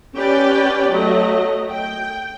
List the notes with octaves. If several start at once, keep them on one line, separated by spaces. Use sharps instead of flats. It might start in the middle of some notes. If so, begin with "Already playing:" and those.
C#4 G4 B4 D5 G5
F#3 A3 D#5
G5